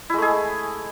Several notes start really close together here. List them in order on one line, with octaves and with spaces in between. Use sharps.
E4 G#3 A3 G#4